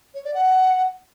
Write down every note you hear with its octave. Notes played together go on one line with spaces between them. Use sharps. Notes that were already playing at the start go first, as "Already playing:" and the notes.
C#5
D5
F#5